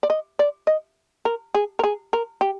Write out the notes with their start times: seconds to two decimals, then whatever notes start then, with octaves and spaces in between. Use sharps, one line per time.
0.03 D5
0.10 D#5
0.39 D5
0.67 D#5
1.25 A#4
1.54 G#4
1.79 A#4
1.84 G#4
2.13 A#4
2.41 G4